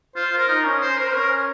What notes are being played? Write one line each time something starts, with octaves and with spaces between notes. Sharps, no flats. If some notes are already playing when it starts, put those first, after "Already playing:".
F4 C5
F4
A#4
D#4
C#4
C5
A#4
C5
C#4 A#4